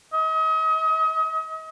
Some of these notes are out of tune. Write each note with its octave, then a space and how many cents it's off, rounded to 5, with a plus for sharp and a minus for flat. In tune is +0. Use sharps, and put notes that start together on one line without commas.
D#5 +40